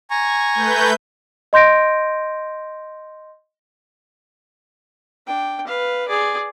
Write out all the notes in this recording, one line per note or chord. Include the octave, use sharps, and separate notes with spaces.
G#5 A#5 C#6
A3 B4 G6
D#5 C6 G6 A#6 D7
D4 G5
B4 F5
G#4 D5